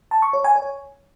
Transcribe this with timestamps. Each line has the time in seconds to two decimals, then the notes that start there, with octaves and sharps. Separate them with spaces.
0.11 A5
0.22 C#6
0.33 C#5
0.44 G#5
0.56 C#5